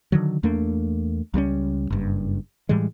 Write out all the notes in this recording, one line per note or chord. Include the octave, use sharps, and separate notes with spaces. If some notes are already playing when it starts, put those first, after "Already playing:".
D3 D#3 F#3
E2 A3 A#3 D4
C#2 G3 A3 C#4
F#1 G2
A2 E3 G3 G#3